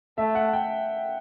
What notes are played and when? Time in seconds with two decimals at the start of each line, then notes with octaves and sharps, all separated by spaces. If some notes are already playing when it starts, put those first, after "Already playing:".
0.18 A3 E5
0.35 F#5
0.53 G5